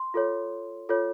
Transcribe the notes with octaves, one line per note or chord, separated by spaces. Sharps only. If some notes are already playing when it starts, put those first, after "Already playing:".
Already playing: C6
F4 A4 C#5
F4 A4 C#5